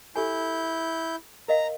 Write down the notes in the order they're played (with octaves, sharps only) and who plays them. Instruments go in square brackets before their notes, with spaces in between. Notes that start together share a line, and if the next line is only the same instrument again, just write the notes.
[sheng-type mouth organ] E4 G6 [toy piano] G4 A4 G#5
[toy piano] A#4 D#5 F5 [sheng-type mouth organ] A#5